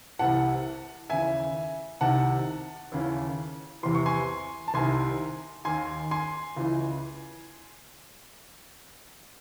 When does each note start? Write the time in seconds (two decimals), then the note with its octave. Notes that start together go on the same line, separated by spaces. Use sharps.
0.19 C2 C3 E3 F#5 A5
1.10 D#2 C#3 E3 E5 G#5
2.01 C2 C3 D#3 F#5 A5
2.92 D#2 C#3 E3
3.83 E2 C3 E3 C6
3.95 C#6
4.06 G#5 C6
4.68 A5
4.74 C2 C3 D#3 G#5 C6
5.65 D#2 D#3 G#5 C6
6.11 G#5 C6
6.56 C#2 C#3 E3